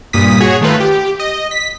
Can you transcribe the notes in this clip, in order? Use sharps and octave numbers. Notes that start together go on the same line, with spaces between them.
G2 A#2 D#6 B6
F#4 G#4 C#5
D#3 A3 F4 B4
G4
D#5
B6